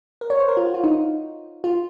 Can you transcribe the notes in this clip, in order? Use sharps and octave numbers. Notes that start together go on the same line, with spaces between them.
A#4
C#5
C5
A#4
F4
F#4
F4
D#4
F4